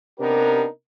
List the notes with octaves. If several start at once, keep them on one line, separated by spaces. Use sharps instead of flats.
C3 B3 D4 D#4 G4 A#4